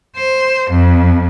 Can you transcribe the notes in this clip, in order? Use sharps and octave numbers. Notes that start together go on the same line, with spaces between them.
C5
F2